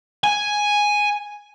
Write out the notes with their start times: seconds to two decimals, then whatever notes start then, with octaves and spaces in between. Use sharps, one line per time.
0.24 G#5